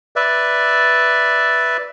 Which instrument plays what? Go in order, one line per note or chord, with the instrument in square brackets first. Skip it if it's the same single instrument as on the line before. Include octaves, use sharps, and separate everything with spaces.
[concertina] B4 D5 E5